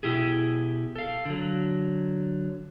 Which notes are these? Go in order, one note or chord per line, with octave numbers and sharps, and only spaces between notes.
B2 E4 G4 G#4
A4 F5
D3 F#3